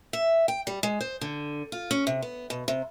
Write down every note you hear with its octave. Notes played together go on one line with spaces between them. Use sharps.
E5
G5
G3
G#3
C5
D3
F4
C#4
C3
B3
B2
C3